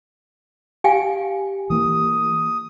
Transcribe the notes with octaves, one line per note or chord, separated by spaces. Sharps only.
G4 F5 G5 G#5
E3 A#3 D#6